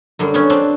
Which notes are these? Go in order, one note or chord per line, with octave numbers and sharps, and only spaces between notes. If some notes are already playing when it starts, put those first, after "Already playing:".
F#2 D3 G3
B3 C#4
C4 D4